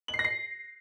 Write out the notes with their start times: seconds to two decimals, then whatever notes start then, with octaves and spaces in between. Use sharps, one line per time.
0.08 F#7
0.14 C7
0.19 A#6
0.24 C7